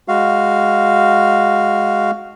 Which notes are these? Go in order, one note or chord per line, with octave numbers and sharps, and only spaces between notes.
G#3 F#4 F5